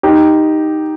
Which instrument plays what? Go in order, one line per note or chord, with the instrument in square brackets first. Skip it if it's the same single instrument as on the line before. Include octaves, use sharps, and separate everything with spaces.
[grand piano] D#4 G4